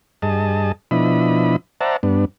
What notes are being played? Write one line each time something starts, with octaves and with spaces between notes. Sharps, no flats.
G2 G#4 D#5 A5
B2 F3 D4 E4 D#5 B5
C5 D5 E5 F#5 A5 A#5
G2 B3 D4